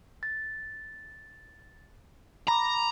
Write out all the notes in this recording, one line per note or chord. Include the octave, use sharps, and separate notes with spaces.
A6
A#5 B5 D6